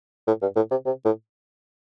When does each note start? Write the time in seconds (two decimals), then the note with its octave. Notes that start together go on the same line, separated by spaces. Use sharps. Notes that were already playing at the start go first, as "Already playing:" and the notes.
0.27 A2
0.42 G2
0.56 A2
0.71 C3
0.86 C3
1.05 A2